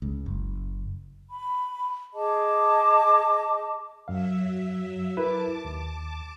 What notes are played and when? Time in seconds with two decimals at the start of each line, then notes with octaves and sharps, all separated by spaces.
0.02 C#2
0.26 F#1
1.29 B5
2.14 G#4 D#5 A5 D6
4.08 F#2 F#3 E5 F5
5.17 E4 A#4 B4 A5 D6
5.65 D#2